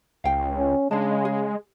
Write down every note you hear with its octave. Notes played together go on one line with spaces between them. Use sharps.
C#2 F5 G5
C#4
C#3 G#3 D4 A5
G#4